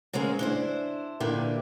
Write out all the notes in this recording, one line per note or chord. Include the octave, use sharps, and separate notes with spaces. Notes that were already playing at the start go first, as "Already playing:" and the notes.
C#3 G#3 A#3 C4 G#4
D4 E4 C5
A#2 D3 E3 D4 E4 G4